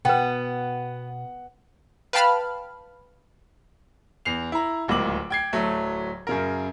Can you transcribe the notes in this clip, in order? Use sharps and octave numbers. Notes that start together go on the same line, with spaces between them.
B2 B3 B4 F#5 G5
B4 F5 G5 A5 B5 F6
E2 C7 F7
E4 A#5
D1 C#2 A#3 D6 F#7
G5 G#6 C7
D1 F#3 A3
F#2 C#3 A#4